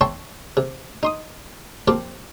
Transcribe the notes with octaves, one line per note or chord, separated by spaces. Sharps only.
C#5 E5 G5 A5 C6 C#6
C3
D#4 C6 D#6
F3 A#3 C4 F4 G4